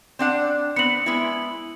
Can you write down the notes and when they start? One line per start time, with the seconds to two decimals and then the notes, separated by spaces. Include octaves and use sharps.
0.19 C4 D4 F#5
0.76 B3 C4 C#7 F#7
1.06 G#3 B3 E4